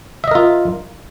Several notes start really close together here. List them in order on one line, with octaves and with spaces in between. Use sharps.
E5 D#5 A#4 F4